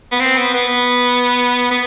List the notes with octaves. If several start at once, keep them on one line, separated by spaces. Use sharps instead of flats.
B3
C4
B3
B3
B3